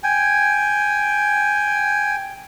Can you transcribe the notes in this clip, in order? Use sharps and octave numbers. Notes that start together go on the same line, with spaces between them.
G5 G#5